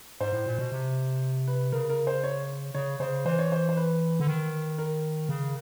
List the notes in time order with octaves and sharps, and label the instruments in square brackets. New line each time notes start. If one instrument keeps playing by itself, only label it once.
[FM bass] G#2 [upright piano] C5
[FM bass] A2
A#2
B2
C3
[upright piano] B4
[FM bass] C#3 [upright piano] A#4
[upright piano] A#4
C5
C#5
[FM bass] C#3 [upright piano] C#5
[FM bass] C#3 [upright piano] C5
[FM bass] E3 [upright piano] C5
[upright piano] C#5
C5
C5
B4
[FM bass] D3
D#3
[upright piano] A#4
[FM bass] C#3